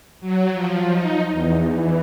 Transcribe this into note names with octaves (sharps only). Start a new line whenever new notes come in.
F#3
F3
D#4
E2
E3